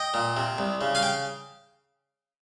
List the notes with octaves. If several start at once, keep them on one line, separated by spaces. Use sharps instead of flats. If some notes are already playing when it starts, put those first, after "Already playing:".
Already playing: D#5 G5
A#2
C3
C2
C#3
F5 G#5
G5